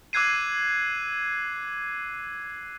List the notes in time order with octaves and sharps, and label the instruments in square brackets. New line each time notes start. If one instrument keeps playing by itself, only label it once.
[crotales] D6 E6 F#6 G#6 C7 D#7